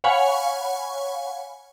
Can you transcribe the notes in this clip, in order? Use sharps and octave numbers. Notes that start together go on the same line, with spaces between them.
C#5 F5 F#5 G#5 B5 C#6